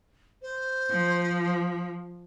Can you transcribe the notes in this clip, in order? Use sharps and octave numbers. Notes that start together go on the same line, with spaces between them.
C5
F3